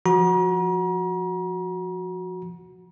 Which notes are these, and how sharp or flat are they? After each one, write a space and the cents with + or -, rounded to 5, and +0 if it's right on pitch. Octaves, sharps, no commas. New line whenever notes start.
F3 +0 F#4 -10 A#5 +40